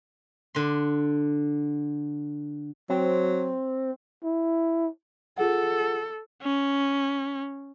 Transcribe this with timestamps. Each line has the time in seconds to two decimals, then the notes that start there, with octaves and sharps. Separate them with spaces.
0.55 D3 C6
2.90 F#3 C4
4.24 E4
5.38 F4 G#4 A4 F#5
6.42 C#4